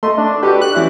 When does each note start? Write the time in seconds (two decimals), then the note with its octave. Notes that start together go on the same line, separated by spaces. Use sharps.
0.03 A3 D#5 C6
0.18 D4
0.43 F#4 G4 A4 B4
0.62 F#6
0.75 E3 C#4 E4